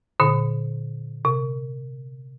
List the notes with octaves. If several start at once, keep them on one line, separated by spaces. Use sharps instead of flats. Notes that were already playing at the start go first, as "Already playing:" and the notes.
A#2 D3
C3